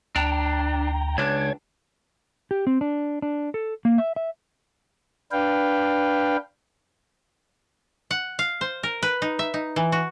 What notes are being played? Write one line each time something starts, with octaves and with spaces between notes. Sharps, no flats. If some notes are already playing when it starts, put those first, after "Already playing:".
D2 D4 G5 A#5
C#2 D4 C#5 G#6
G4
C4
D4
D4
A4
A#3
E5
E5
D4 B4 F5 G5
F#5
F5
C5
A#4
B4
D#4
E5
D#4
E3
F#4